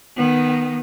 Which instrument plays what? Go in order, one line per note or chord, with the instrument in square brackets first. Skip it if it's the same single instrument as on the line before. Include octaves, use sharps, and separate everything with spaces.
[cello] D#3 B3